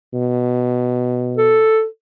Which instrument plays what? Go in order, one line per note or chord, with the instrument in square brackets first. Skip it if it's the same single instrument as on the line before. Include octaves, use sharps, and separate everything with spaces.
[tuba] B2
[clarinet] A4